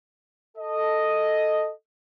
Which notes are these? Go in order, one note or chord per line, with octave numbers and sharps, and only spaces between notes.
A4 D#5